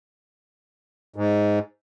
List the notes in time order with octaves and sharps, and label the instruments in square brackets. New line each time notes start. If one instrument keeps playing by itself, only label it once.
[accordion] G#2